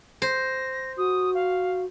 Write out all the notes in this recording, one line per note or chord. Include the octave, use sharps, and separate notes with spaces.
C5 A#6
F#4 D#6
F5